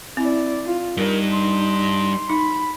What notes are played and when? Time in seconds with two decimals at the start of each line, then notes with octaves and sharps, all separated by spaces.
0.17 C4 E4 D5
0.66 F4
0.97 G2 G3 D#4 A#4
1.32 C6
2.30 D#4 B5